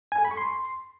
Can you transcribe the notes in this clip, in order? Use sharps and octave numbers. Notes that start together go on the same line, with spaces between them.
G#5
A4
B5
C#6
C6